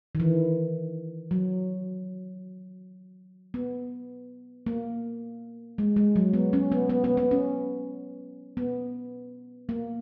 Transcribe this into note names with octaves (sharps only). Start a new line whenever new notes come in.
D#3
E3
F#3
B3
A#3
G#3
G#3
F#3
B3
C#4
B3
B3
B3
B3
C#4
B3
A#3